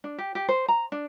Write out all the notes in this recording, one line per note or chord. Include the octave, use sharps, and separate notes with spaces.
D4
G4
G4
C5
A#5
D4